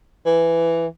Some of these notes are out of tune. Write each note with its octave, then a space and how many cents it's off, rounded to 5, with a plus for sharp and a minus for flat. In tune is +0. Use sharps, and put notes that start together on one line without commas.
E3 +10